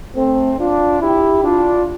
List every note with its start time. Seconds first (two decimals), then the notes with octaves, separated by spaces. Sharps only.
0.15 A3 C4
0.58 D4 F4
1.01 E4 G4
1.44 D4 F4